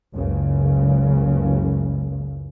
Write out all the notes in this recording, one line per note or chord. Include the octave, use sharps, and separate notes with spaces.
F#1 C#2 C#3